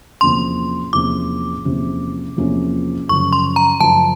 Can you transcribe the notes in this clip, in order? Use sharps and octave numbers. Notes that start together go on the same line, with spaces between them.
E2 C3 F3 A#3 C#4 C6
E2 C3 F3 A#3 C#4 D6
E2 C3 F3 A#3 C#4
E2 C3 F3 A#3 C#4
F#2 C#3 F3 C#6
C6
A#5
F#2 C#3 F3 A5